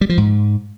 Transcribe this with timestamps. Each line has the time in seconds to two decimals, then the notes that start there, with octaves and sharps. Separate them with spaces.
0.01 G3
0.09 F3
0.18 G#2